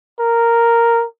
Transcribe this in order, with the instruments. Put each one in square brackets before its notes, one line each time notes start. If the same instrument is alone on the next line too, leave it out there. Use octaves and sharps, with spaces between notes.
[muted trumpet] A#4